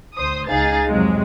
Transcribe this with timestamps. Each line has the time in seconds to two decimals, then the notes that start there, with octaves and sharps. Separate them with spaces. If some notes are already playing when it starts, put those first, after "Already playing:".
0.16 D2 C5 D#6
0.48 C#2 D#4 G#4 F5 A6
0.89 F2 C3 F#3 G#3